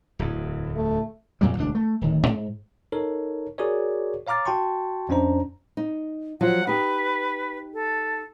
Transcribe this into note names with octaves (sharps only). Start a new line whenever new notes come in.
D1 E2
A3
F2 A#2 F#3 G3
E1 D2 D4
A3
D1 D#3
G#2
D#4 A4 A#4 C#5
F#4 G#4 A#4 C#5 D5
C#5 F5 A#5 D6 F6 A6
F#4 G5 A5 C6 C#6
F2 C#4 D4 C5 A#5
D#4
F3 F#3 F4 F#5
D#4 G4 B4
A4